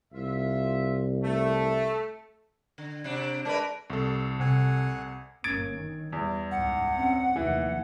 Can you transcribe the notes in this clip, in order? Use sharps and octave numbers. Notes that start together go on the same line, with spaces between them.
C2 F4 E5
A3
D3
C3 F#3 D4
G#3 D4 A#4 B4
C2 A4
C3 F#5 G#5
G1 A#3 C#4 G#6 A6 D7
D#3
E2 G3
C#2 G#2 F#5
C4 C#4
F1 D#2 D#3 E3